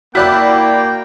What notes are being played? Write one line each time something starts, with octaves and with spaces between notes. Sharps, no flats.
A#3 E4 F#4 D5 G5 B5 F#6